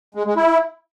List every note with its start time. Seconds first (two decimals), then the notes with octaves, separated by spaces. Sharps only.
0.15 G#3
0.25 G#3
0.36 E4